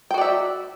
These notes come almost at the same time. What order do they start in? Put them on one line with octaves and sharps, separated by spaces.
G5 F#4 D5 E5